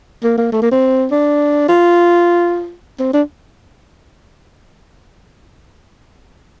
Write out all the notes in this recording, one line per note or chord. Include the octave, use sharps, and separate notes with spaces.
A#3
A#3
A3
A#3
C4
D4
F4
C4
D4